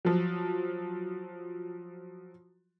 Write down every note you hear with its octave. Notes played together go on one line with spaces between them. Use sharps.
F3 F#3